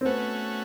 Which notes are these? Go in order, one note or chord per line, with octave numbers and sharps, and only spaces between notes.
C4
A3 B3 C#4 F#4